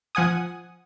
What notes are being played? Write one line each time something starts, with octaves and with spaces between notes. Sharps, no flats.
F3 F#5 G#5 D#6